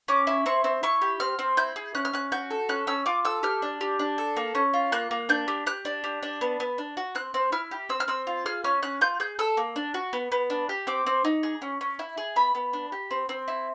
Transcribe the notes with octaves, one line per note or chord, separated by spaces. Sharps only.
C#4 D6
E4
C4 C#6
C4
E4 C#6
G4
C4 F6
C4
E4 G6
G#4
C#4 F#6
F6
C#4 F#6
F#4 G6
A4
C#4 F#6
C#4 E6
F4 D6
A4 E6
G4 F6
D4
G4
D4
A4
A#3
C#4
F4
A#3 F#6
A#3
D4 G6
G4
G4 F#6
D4
G4
D4
B3
B3
D4
F#4
C4 F#6
C4
E4 F6
G4
C4 E6
F6
C4 E6
F4
G#4 F6
C#4 F6
C#4 F#6
F4 G6
G#4 G6
A4 E6
A#3
D4
F#4
B3
B3
D4
G4
C4 D6
C4
D#4
G#4
C#4
C#4
E4
G#4
B3 B5
B3
D4
G4
C4
C4
E4